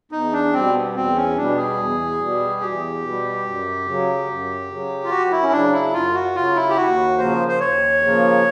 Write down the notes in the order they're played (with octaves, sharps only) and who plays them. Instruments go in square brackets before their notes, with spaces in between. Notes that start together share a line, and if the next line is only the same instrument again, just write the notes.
[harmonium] E2 [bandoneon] D#4
[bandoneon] D4
[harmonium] B2 G3 [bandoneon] C4
[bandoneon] B3
[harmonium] E2 [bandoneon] C4
[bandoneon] C#4
[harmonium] B2 G3 [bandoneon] D4
[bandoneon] G#4
[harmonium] E2
B2 G3
[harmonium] E2 [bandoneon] G4
[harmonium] B2 G3
F#2
C#3 F#3
F#2
C#3 F#3
[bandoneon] F4
[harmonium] F#2 [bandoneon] F#4
[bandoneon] E4
C#4
[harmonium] C#3 F#3 [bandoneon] D4
[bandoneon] E4
[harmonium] F#2 [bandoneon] F4
[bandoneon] F#4
[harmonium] C#3 F#3 [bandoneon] F4
[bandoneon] E4
G4
[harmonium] D#2 [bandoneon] F#4
[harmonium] C#3 F3 A#3 [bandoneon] C5
[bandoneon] C5
[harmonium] D#2 [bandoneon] C#5
[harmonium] C#3 F3 A#3